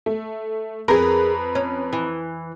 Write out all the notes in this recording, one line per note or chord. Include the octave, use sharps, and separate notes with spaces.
A3
F2 G#4 A#4 B4 A#5
C#4
E3